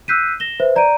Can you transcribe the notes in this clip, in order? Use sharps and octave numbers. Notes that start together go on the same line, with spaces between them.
E6 F#6 G6 B6 C7 D#7
A#6 E7 G7
B4 C5 E5
D5 A#5 G6 D7 D#7